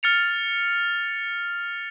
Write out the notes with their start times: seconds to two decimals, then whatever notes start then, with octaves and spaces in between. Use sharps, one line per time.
0.03 F6 A6 C#7 F7